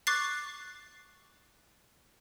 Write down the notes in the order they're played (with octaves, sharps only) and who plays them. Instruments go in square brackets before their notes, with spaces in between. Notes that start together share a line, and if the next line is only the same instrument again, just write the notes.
[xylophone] C#6 D6 F#6 A6 C7